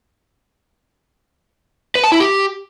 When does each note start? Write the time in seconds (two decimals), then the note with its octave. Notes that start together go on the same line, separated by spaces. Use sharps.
1.95 B4
2.04 A5
2.12 E4
2.20 G4